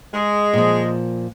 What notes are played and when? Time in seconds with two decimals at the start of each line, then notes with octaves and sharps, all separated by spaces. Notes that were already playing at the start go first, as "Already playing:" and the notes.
0.14 G#3
0.54 A#2 F3